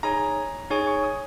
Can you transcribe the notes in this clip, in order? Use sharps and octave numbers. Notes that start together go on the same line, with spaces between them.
D#4 G#4 C#5 G#5 A#5
D#4 G#4 C#5 G#5 C#6
C#6
D#6